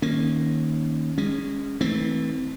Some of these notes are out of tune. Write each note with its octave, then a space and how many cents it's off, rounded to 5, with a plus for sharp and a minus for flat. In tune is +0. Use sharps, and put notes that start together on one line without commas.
D#3 +0 A#3 +0 C#4 -25
G#3 -25 C#4 +0
E3 -35 A3 +0 C4 +0